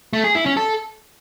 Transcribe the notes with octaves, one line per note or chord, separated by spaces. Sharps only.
A3
G#4
E4
C#4
A4